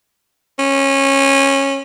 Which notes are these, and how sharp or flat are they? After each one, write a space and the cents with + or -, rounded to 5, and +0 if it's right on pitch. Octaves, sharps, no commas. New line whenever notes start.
C#4 -20